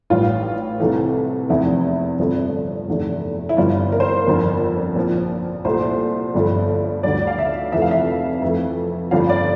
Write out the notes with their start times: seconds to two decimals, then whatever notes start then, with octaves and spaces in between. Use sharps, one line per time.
0.10 A1 A2 E3 G3 F4
0.80 C2 C3 E3 A3
1.49 F1 E2 C3 E4
2.19 G1 G2 F3 A3
2.88 F1 E2 D3 A3
3.49 E4
3.57 G1 G2 E3 G3 F4
3.92 A#4
4.00 C5
4.08 A#4
4.27 G1 F2 D3
4.96 A#1 A#2 F3
5.65 C2 A#2 A3 C5
6.35 G1 G2 F3 A3
7.03 D2 D3 G3 D5
7.27 F5
7.38 E5
7.72 F1 F2 C3 E3 A3 E5
7.82 F5
7.91 E5
8.42 F2 E3 A3
9.11 G1 G2 F3 A3 F5
9.29 D5